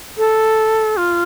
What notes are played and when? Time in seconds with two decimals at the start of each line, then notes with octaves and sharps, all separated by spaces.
0.18 A4
0.97 F4